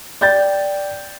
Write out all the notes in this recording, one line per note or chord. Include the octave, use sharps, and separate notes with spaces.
D5 G5 G6 A6